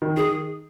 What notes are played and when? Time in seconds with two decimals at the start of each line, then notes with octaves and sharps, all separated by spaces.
0.02 D#3
0.17 D#3 G#4